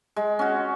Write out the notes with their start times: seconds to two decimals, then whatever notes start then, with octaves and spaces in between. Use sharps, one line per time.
0.16 G#3
0.39 C#4 F#4